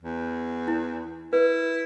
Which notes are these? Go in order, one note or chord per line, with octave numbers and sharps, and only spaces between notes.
E2
E4
E4 B4